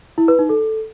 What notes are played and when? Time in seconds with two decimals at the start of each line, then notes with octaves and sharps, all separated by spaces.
0.18 E4
0.28 B4
0.39 D#4
0.49 A4